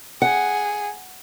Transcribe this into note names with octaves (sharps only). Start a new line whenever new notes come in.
G#4 F#5